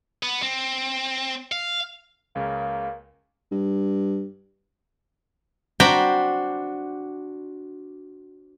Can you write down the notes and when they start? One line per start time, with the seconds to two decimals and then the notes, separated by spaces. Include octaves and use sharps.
0.23 B3
0.42 C4
1.52 F5
2.35 C#2 C#3 A#3
3.51 G2
5.80 D4 F#4 C5 G5 A#5 B5